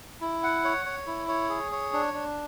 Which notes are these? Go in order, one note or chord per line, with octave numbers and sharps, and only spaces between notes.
E4
F#5
C#5
C#5
E4
C#5
G#4
C#5
D4
D4